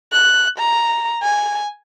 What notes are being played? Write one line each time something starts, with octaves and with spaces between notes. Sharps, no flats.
F#6
A#5
G#5